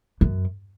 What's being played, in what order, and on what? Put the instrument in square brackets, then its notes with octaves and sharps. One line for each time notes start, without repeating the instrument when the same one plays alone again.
[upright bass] F#2